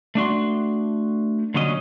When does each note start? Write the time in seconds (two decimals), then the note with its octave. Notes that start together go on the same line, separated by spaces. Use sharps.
0.15 A3 D4 F#4 C6
1.54 A#2 D3 F#3 C#4 D#5